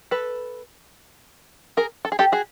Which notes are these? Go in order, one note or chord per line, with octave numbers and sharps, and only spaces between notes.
A4 B4
G#4 A#4
A4
G#4
G4 A4
F#4 G#4